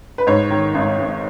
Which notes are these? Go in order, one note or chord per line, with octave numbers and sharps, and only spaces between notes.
B4
G#2 C#5
D#3
G#1
G#1